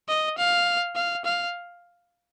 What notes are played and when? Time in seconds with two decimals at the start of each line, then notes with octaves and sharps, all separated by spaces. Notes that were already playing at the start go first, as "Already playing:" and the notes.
0.08 D#5
0.38 F5
0.95 F5
1.25 F5